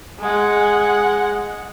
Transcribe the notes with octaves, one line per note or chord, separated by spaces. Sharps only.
G#3 F#5